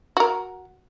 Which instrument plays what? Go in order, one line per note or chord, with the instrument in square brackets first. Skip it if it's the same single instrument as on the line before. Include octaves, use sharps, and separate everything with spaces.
[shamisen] F#4 A#4